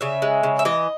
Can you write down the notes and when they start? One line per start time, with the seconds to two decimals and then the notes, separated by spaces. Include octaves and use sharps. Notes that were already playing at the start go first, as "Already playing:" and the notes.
0.01 C#3 E5
0.22 G#3
0.43 C#3
0.59 E5
0.65 E3 D#5